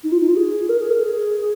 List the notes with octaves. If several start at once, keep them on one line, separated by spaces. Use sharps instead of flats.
D#4
F4
D#4
F4
G#4
A#4
G#4
A#4
G#4